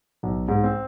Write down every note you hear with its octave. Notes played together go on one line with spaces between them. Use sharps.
B1
G#2
C4